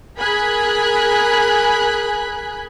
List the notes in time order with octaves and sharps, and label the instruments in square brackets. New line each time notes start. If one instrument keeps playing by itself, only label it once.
[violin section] G#4 A#4 G#5 B5 F#6